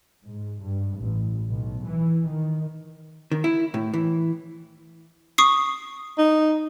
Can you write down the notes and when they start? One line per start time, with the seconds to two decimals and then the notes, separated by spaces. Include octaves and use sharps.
0.25 G#2
0.63 G2
0.99 A1
1.49 B1
1.87 E3
2.27 D#3
3.32 D#3
3.44 E4
3.74 A2
3.94 E3
5.38 C#6 D#6 C7
6.18 D#4